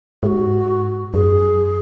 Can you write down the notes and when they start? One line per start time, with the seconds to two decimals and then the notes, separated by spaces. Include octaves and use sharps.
0.23 G#2 F#4 G#4
1.14 F#2 G#4